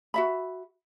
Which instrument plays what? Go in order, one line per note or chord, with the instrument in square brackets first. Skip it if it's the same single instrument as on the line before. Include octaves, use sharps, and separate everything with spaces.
[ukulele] F#4 E5 B5